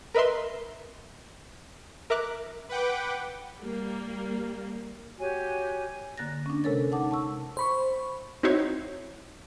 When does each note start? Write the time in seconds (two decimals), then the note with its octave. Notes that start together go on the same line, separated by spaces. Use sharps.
0.14 A#4 B4 D#5 E5 C6
2.10 A#4 E5 A#5 D6 F#6
2.69 B4 F#5 G5 D6
3.61 G3 A#3
5.20 F#4 G4 C#5 G#5
6.18 D3 A#3 F#6 A6 A#6
6.46 C#4 D4
6.64 C3 G#3 A4 A#4 C#5 A6
6.92 D#4 F#5 A5 D6
7.11 A5 C#6 E6
7.57 C5 B5 C#6
8.43 C4 D#4 E4 F#4 C5 C#5